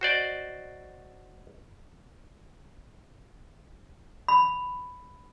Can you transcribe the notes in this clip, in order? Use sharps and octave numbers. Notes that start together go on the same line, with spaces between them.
F#4 C5 D5 D#5
B5